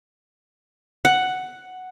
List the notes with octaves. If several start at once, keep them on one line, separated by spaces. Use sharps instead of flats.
F#5